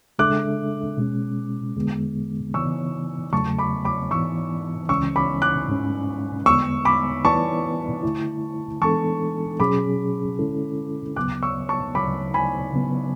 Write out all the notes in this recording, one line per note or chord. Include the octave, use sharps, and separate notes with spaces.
C#3 G#3 D4 A4 E5 D6 F#6
B2 G#3 C#4
E2 D3 G#3 B3
C#3 E3 B3 C#6 E6
E2 C#3 F#3 A3 A5 C#6
B5 D6
B5 D6
G#2 E3 B3 C#6 E6
C#2 C#3 E3 G#3 C#4 C#6 E6
B5 D6
D6 F#6
G#2 G#3 C#4
E2 D3 G#3 B3 C#6 E6
B5 D6
E3 B3 E4 B4 D5 A5 C#6
D3 A3 E4
E3 G#3 B3 D4 A4 A5 C#6
B2 F#3 C#4 G#4 B5 D6
D3 G#3 C#4 E4 A4
D2 C#3 F#3 B3 D6 F#6
C#6 E6
A5 C#6
D2 C#3 F#3 B5 D6
G#5 B5
C#3 F#3 B3